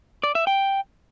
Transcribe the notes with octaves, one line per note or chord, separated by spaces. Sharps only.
D5
E5
G5